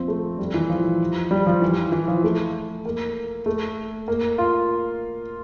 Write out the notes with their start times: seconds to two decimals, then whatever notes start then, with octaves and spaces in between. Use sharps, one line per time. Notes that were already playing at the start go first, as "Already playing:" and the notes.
Already playing: F3 C4
0.08 A3
0.38 G3
0.54 E3
0.70 F3
1.31 G3
1.47 F3
1.62 E3
1.92 E3
2.08 F3
2.24 A3
2.85 A#3
3.46 A3
4.08 A#3
4.38 F4